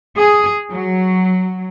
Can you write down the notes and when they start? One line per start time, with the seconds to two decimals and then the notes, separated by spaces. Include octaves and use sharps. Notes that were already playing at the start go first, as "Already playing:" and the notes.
0.17 G#4
0.72 F#3